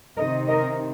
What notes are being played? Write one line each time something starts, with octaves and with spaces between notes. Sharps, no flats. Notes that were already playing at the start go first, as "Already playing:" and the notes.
C3 D#3 C4 D#4 A#4 D#5
A#4 D#5